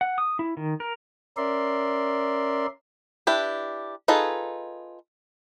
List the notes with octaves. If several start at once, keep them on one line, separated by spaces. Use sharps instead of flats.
F#5
D#6
E4
D#3
A#4
C#4 A#4 D5 E5 C6
D4 E4 G4 B4
D#4 F4 G#4 A4 B4